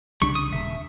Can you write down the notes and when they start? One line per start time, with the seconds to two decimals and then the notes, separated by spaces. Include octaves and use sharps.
0.22 C2 C#3 G3 D4 C#6
0.35 D#6
0.53 D#1 E5